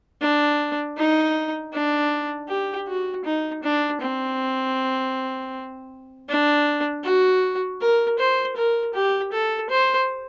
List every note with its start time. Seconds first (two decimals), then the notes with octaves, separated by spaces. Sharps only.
0.21 D4
0.97 D#4
1.73 D4
2.49 G4
2.87 F#4
3.25 D#4
3.63 D4
4.01 C4
6.29 D4
7.04 F#4
7.81 A#4
8.19 C5
8.57 A#4
8.94 G4
9.32 A4
9.70 C5